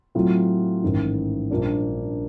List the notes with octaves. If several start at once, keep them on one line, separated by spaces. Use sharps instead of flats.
A2 F#3 A3 C4 F4
A1 G#2 D#3
A#1 A#2 G3 A#3 D4